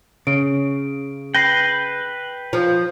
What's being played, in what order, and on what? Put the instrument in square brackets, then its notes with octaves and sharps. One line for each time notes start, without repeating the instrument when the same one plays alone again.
[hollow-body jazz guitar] C#3 [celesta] D7
[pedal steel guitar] B4 G5 [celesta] A#6 C7
[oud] F3